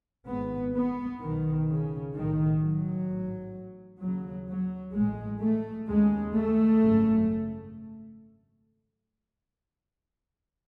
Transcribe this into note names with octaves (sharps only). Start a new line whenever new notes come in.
G#1 G#2 B3
B3
B1 B2 D#3
C#3
B1 A2 D#3
F#3
A1 G#2
D#2 C#3 F#3
F#3
A1 A2 G#3
A3
D#2 C#3 G#3
A3
G#1 F#2 C#3